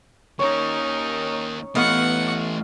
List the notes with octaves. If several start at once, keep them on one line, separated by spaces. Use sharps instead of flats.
D#2 C#4 D#4 A#4 C#5
E3 A3 B3 D#5 F5 F#5 C#6